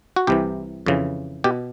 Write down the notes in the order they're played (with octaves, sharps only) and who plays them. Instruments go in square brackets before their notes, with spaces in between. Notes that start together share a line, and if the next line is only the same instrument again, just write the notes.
[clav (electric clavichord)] F#4
C2 C3 E3 G4
F2 C#3 E3
B2 G4